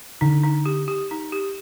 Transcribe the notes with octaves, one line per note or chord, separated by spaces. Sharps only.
D3 D#4
D#4
G4
G4
D#4
G4